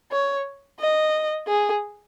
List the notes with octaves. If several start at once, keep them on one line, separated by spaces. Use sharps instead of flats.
C#5
D#5
G#4